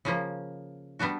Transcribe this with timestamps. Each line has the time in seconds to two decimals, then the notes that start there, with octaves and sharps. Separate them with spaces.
0.05 C#3 F3 A#3
0.99 G3 B3 D4 F#4